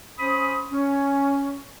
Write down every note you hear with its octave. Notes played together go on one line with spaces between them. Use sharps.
C#4 C5 B5 D#6
C#4